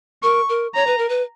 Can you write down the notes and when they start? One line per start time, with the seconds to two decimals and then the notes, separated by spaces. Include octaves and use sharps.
0.23 A#4 C#6
0.49 A#4
0.75 C#5 A#5
0.87 B4
0.98 A#4
1.09 B4